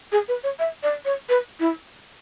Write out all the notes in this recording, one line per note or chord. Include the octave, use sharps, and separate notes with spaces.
G#4
B4
C#5
E5
D5
C#5
B4
E4